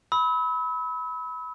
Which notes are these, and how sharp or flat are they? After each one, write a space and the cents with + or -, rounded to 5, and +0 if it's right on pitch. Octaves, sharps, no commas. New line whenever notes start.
B5 +0 E6 -40